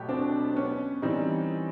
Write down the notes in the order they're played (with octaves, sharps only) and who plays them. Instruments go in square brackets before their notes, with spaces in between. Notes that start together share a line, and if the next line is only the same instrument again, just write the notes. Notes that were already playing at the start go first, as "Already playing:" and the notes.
Already playing: [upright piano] B2 F#3 A3 G4
[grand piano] C4 D4
B3 C#4
[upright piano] E3 G3 C4 D#4